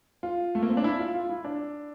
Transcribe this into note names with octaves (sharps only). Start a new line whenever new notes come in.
F4
A3
A#3
C4
D4
E4
F4
F4
E4
D4